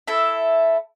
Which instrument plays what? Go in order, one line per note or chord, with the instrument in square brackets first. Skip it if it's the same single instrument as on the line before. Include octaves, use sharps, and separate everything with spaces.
[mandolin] E4 A4 E5